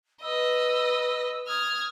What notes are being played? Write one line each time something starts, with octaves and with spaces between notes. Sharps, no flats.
B4 D#5 E6
D#6 F6 G#6